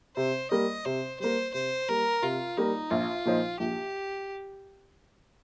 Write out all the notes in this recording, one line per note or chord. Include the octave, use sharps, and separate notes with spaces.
C3 C5
G3 A#3 D#5
C3 C5
G3 A#3 C5
C3 C5
G3 A#3 A#4
C3 F4
G3 A#3 D#4
A#1 F4
A#2 F3 D#4 C5
A#1 G4